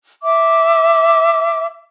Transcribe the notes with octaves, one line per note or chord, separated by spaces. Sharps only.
E5 D6